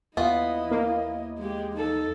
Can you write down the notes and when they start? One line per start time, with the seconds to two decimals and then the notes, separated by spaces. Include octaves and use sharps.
0.17 D#2 B3 E4 F4 D#5
0.71 A#3
1.38 G#3 G4
1.74 D#4 A4